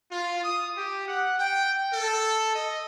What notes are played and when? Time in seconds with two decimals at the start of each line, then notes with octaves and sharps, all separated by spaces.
0.11 F4
0.44 D#6
0.77 G4
1.08 F#5
1.39 G5
1.92 A4
2.54 D#5